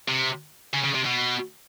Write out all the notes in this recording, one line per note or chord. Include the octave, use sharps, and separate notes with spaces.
C3
C#3
C#3
C3
B2